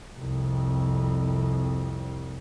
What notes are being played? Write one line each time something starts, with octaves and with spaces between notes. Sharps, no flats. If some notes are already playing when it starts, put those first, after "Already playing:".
C2 F2